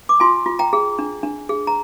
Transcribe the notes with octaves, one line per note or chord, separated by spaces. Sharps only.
D6
F4 G#5 C6
F4
G5 A#5
G#4
D4
D4
G#4
A#5